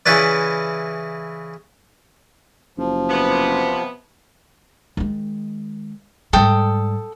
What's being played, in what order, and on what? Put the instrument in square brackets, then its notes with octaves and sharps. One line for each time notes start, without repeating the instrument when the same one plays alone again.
[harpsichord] C#3 E3 E4 B4 D5
[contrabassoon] F#1 [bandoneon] F3
[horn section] C3 B3
[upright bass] D#3 G#3
[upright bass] G#2 G3 [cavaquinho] A4 G5 D#6